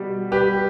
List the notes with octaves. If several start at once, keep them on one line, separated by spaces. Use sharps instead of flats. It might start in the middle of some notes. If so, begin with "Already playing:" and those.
Already playing: B2 G3 G4
G3 G4 B4